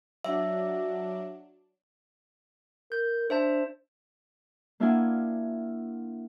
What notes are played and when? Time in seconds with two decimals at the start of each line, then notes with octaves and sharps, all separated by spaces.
0.25 F#3 D4 E5
2.92 A#4 G6
3.30 D4 C5 E5 A5
4.80 A#3 D4 E4 F4 F#5 G#5